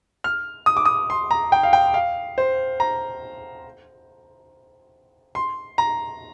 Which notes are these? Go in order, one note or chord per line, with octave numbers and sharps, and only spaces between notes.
F6
D#6
D6
D#6
C6
A#5
G5
F5
G5
F5
C5
A#5
C6
A#5